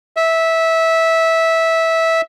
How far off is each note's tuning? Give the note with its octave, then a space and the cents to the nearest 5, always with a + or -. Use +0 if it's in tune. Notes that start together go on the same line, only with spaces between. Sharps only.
E5 -15